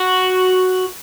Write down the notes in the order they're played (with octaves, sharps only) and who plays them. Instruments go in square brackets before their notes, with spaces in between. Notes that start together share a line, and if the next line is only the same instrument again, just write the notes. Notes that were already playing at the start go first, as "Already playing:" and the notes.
Already playing: [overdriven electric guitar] F#4